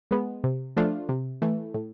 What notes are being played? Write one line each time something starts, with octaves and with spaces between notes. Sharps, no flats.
G#3 B3
C3
F3 A3 D4 F4
C3
E3 A3
A2